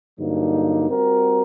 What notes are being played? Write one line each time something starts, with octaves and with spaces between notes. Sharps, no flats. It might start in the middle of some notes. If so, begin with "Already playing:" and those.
G2 D3 F#3 A#3 D#4
G3 C4 F#4 A#4